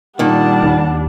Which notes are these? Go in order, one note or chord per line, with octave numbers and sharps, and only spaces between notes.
A#2 D#3 G3 D4 F#5 A5
D#2